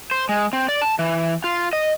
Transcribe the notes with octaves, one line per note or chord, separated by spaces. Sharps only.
C5
G#3
C4
D5
A5
E3
F4
D#5